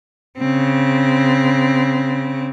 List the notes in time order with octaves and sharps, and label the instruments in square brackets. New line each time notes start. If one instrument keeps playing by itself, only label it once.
[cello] C#3 C4